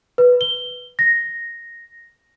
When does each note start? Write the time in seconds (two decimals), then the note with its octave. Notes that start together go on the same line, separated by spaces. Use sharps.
0.18 B4
0.41 G7
0.99 A#6